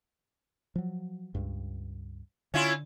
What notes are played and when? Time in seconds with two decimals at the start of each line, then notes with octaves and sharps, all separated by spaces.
0.75 F3 F#3
1.35 C#2 G2
2.54 D3 C#4 E4 F4